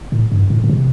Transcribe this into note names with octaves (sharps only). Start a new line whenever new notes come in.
A2
G2
A2
A2
C3